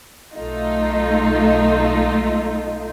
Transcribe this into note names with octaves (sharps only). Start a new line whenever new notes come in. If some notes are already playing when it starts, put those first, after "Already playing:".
B1 A3 D#4 F4